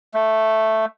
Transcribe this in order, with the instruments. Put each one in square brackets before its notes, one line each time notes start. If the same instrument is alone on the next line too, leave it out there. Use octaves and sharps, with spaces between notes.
[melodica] A3